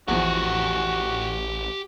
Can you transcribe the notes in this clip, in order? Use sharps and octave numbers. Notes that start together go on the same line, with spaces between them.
A1 E2 E3 F3 F#4 G4 F#5